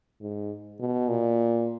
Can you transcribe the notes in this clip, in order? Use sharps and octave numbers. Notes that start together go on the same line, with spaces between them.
G#2
B2
A#2